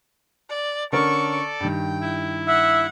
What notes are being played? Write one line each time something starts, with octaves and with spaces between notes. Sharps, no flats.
D5
D3 C#4 A4 A#4 D5 C#6
G2 D#3 G5
E4
E5 F#5